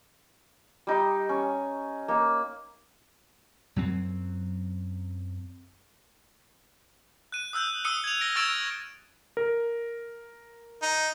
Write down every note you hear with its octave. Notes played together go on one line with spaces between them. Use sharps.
G3 D#4
C#4
A#3 D#4
F#2 F#3 C4
F#6 D#7
D#6 E6 F#6 G6
D#6 E6 C#7 D#7 G7
G#6 F7
F6 A#6 D7
C#6 E6 G#6 A6 D7 E7
A#4
D#4